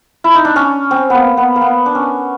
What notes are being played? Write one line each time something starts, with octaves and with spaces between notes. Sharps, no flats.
E4
D#4
D4
C#4
C4
A#3 B3
B3
A#3
B3
D4
C#4